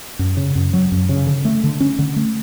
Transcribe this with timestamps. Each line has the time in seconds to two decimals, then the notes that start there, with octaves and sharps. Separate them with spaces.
0.19 F#2
0.37 C#3
0.55 F#2
0.73 F#3
0.92 F#2
1.09 C#3
1.27 D3
1.45 A3
1.64 D3
1.80 C#4
1.99 D3
2.16 A3